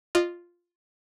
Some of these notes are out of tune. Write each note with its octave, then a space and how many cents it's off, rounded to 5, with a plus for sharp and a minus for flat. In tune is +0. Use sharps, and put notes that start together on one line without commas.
F4 +0 D#5 -30